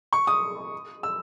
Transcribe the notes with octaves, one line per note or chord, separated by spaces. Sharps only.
C#6
D#6
E6